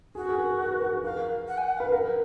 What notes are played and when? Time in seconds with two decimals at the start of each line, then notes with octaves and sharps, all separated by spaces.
0.15 F#4 G#4
0.29 G#4
0.38 A#4
0.60 A#4
0.71 B4
0.81 A#4
0.93 G#4
1.04 A#4 F5
1.48 F#5
1.58 G#5
1.63 F#5
1.77 B4 F5
1.92 A#4